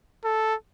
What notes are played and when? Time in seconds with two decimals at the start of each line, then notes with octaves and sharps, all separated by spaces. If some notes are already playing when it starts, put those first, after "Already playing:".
0.24 A4